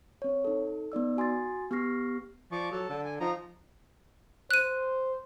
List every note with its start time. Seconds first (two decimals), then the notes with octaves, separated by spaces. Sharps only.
0.22 C4 C#5
0.44 D#4 A4
0.92 B3 D#4 D5 E6
1.17 F#4 G#5 C6 D#6 A6
1.71 B3 G4 C#6 F6 A#6 C7
2.52 F3 D5 C#6 D6
2.72 F#3 A4 A5
2.89 D3
3.05 G#5
3.20 F3 D#4 A#5
4.51 C5 F#6 D#7